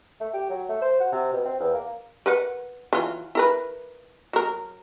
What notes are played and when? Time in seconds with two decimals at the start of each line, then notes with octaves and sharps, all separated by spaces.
0.21 A3
0.34 G4
0.50 F#3
0.69 A3
0.82 C5
1.00 F#4
1.12 C3
1.33 B2
1.45 C4
1.60 E2
1.74 A#3
2.26 A#4 B4 F#5
2.93 E3 F#3 F4
3.35 E4 A#4 B4
4.33 F#3 A#4